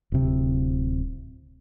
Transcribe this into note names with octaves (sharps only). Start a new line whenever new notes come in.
D1 C3